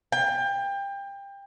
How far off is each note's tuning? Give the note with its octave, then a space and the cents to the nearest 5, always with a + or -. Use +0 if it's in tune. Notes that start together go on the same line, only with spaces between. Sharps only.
G5 +25